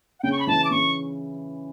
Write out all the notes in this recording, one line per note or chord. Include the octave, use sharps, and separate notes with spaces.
F#5
C#3 G5
C#6
B5
E3 A5
D6
C#3 C#6